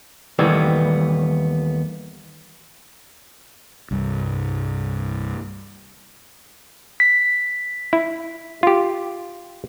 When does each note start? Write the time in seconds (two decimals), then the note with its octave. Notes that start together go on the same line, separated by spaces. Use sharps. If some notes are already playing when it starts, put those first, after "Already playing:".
0.39 D#2 D#3 E3 G3 A3 B3
3.91 C2 G2
7.00 B6
7.93 E4
8.63 F4 G4